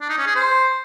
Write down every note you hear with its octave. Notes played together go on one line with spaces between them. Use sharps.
D4
D#4
C#4
G#4
C5